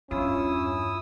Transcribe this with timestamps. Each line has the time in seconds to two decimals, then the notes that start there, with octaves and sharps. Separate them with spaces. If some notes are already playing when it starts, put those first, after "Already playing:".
0.11 E2 G2 C#4 E4 F4 D#6 E6